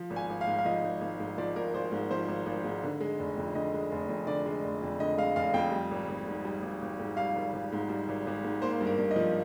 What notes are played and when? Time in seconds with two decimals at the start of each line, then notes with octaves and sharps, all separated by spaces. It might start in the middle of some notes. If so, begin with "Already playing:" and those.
Already playing: F3
0.10 G#1
0.16 G#5
0.29 G#1
0.41 F5
0.47 G#2
0.58 F5
0.65 F3 D#5
0.83 G#1
1.01 G#1
1.20 G#2
1.38 F3 D5
1.56 G#1 A#4
1.74 G#1 C5
1.92 G#2
2.11 F3 C5
2.28 G#1
2.46 G#1
2.64 G#2
2.83 D3
3.00 G#3
3.19 F1
3.37 F2
3.55 D3 D#5
3.74 G#3
3.92 F1
4.09 F2
4.27 D3 D5
4.46 G#3
4.64 F1
4.82 F2
5.00 D3 D#5
5.18 G#3 F5
5.36 F1 F5
5.54 F2 G5
5.72 G3
5.91 G#1
6.09 G#1
6.27 G#2
6.45 G3
6.62 G#1
6.82 G#1
7.00 G#2
7.17 G3 F5
7.35 G#1
7.53 G#1
7.72 G#2
7.89 G3
8.08 G#1
8.27 G#1
8.44 G#2
8.62 A#3 C5
8.81 G2
8.87 A#4
8.99 G2
9.11 D#5
9.16 F3